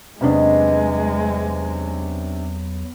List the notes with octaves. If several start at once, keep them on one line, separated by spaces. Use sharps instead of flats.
E2 C3 F#3 G#3 B3 C#4 D4 D#5